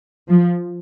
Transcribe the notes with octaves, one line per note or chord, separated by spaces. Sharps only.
F3